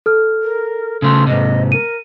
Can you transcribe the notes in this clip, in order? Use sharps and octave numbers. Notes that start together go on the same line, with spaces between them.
A4 F6
A#4
C#3 A3 C6
G#2 C3 D#5
A#4 D#7